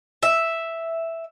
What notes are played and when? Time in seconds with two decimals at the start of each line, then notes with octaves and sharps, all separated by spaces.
0.23 E5